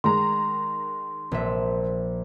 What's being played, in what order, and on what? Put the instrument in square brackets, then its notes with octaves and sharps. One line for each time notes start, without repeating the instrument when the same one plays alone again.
[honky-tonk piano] D#3 G#3 A#5 [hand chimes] C6
[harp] A#1 E5